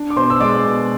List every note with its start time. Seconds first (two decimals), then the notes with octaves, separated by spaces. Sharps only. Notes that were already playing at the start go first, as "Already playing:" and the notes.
Already playing: D4
0.10 D6
0.16 B2 C5 C6
0.30 E6
0.40 G#3 D5 D6
0.64 B2